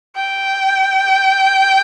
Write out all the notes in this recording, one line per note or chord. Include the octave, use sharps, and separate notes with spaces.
G5